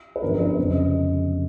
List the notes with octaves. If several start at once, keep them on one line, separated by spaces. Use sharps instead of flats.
B4
G1 F#2 D3 F3 A#4
B4
F1 E2 C#3 F#3 C5
D#5